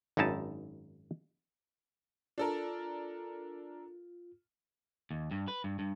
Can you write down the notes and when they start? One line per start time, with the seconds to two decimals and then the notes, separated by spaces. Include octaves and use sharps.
0.17 G#1 F#2 D#4 E4 A5
2.38 D4 F4 A4 A#4
5.11 D#2
5.31 G2
5.48 B4
5.64 G2
5.79 G2